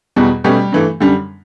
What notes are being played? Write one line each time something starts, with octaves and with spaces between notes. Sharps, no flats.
E2 B2 G3 B3
B2 G3 A3 C#4 G4
G2 E3 A3
F#2 D3 G3